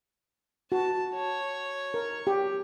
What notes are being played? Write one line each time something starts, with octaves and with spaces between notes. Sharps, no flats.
F#4 A5
C#5
A#4
G4